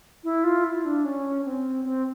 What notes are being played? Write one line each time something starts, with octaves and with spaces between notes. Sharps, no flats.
E4
F4
E4
D4
C#4
C4
C4